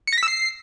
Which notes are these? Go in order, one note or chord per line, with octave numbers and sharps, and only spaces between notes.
C#7
A#6
B6
E6
C7